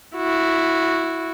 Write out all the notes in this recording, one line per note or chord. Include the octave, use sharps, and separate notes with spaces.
E4 F#4